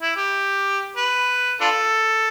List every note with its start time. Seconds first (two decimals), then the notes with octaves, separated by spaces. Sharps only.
0.01 E4
0.16 G4
0.96 B4
1.61 D4 F4 A4